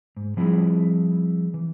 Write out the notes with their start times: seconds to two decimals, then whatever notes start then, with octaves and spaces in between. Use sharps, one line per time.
0.17 G#2
0.37 F3 G3 C4 E4 G#4 B5
1.54 E3